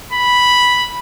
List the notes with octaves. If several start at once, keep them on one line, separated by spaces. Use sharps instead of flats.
B5